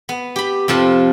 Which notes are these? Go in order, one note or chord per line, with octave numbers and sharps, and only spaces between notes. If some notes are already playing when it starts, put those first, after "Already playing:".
B3
G4 B5
F2 C3 F3 A5